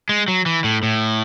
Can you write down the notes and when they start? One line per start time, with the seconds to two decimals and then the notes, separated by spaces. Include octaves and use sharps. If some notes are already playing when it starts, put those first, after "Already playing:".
0.09 G#3
0.28 F#3
0.46 E3
0.64 A2
0.83 A2